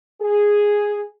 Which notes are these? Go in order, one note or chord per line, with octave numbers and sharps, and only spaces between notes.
G#4